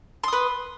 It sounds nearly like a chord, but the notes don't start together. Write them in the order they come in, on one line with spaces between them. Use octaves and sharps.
C6 D#6 B4